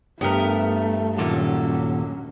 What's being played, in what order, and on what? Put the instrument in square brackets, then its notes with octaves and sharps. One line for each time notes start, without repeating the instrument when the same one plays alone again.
[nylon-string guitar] G2 [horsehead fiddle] A3 [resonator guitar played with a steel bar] B3 G4 A#4
[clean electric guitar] D#2 A#2 [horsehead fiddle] F#3 C#4 [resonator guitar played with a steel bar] A#3 A4